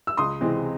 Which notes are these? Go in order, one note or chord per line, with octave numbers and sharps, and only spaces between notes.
E6
C#2 C6 D#6
C3 E3 G#3 C4